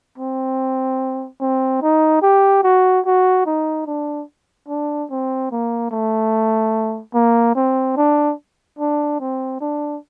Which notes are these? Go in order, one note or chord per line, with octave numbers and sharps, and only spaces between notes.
C4
C4
D#4
G4
F#4
F#4
D#4
D4
D4
C4
A#3
A3
A#3
C4
D4
D4
C4
D4